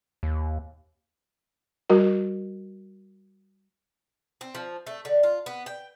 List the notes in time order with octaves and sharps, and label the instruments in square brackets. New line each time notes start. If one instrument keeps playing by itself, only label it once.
[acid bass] D#2
[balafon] G3 F#4 A#4
[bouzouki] C4
F3
A3
D3
F4
B3
G5